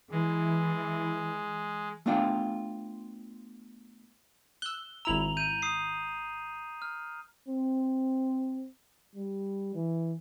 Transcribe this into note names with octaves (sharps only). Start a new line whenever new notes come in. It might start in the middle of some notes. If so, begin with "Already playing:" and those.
E3 G#3
A3 B3 D4 F4 F5 G5
E6 F#6 G7
G#1 E4 A#5 E6 F7 F#7
G6 D#7
D#6 C7
F6
C4
G3
E3